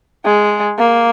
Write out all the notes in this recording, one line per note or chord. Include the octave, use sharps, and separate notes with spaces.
G#3
A#3